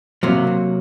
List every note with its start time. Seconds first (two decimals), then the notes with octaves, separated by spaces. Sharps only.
0.23 C3 F#3 A#3
0.47 C3